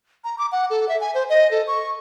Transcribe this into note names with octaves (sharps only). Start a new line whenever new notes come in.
A#5
D6
F#5
A4
E5
G#5
C5
D#5
A4
C#6